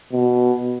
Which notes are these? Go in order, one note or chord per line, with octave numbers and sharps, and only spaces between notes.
B2